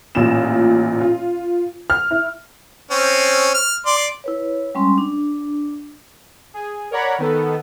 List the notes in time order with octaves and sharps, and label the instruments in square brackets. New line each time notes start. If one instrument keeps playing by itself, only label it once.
[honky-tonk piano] A1 A#2 F4 E7
F4
F6
E4
[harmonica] C4 C#4
F6
D5 C6
[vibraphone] E4 B4 C#5
G3 G#3 C#4 C6
D4
[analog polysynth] G#4
A#4 C#5 D5 F#5 A#5 B5
D#3 B3 A4